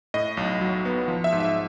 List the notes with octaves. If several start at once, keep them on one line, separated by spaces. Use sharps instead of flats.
A2 D#5
B1
F#3
B3
F3
E5
G#2
E5